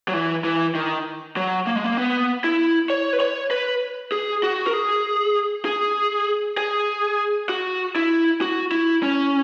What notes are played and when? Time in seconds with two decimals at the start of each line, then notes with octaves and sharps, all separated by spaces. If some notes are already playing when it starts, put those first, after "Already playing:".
0.08 F#3
0.14 E3
0.44 E3
0.75 D#3
1.36 F#3
1.67 A#3
1.76 G#3
1.84 A#3
1.97 B3
2.44 E4
2.90 C#5
3.13 B4
3.20 C#5
3.51 B4
4.12 G#4
4.43 F#4
4.67 A#4
4.73 G#4
5.65 G#4
6.57 G#4
7.49 F#4
7.96 E4
8.41 F#4
8.72 E4
9.03 C#4